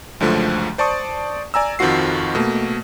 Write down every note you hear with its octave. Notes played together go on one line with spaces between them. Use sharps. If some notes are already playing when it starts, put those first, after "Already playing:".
C#2 F#2 D3 F3 A3
C5 D5 A5 C#6 D#6
D5 G#5 A#5 E6
F2 D#3 F3 F4 F#4 C7
B2 A3 A#3